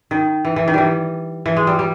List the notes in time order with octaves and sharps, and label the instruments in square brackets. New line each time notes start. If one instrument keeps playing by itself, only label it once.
[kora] D#3
E3
E3
D#3
E3 G3
E3
G#3
G3
G3